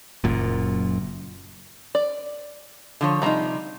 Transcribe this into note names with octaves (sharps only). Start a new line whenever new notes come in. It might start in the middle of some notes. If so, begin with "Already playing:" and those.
F#1 F#2 A#2
D5
D3 F3 C#5
C3 F3 G3 D#4 A#5